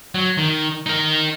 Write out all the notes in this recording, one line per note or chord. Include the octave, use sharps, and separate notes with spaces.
F#3
D#3
D#4 A#4